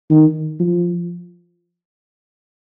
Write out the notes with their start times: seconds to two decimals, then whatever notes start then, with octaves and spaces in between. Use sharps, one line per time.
0.10 D#3
0.59 F3